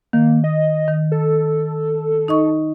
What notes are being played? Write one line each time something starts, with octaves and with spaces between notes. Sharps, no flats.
D#3 A#3
D#5
D#3
A4
D#4 D#5 C#6